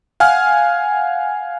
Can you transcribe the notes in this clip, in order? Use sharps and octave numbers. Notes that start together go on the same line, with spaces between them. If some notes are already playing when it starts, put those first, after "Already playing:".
F5 F#5 G#5 F6